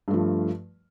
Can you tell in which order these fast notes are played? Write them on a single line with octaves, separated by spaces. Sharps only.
G2 A3 F3